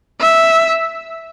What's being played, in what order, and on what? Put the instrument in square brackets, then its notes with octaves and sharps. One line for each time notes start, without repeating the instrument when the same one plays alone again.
[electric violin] E5